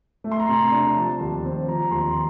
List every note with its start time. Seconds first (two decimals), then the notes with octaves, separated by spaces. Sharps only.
0.24 A3
0.31 C6
0.40 A#5
0.46 C3 C6
0.72 D4
0.96 F3 A5
1.21 D#2
1.45 C4
1.67 F3 A#5
1.91 D#2 C6